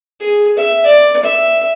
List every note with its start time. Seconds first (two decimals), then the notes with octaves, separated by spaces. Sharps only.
0.20 G#4
0.58 E5
0.86 D5
1.23 E5